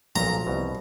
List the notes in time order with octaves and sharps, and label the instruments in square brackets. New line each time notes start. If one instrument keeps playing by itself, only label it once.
[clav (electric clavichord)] B1 A#2 [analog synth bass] F3 [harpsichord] A#5
[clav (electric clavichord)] C2 B2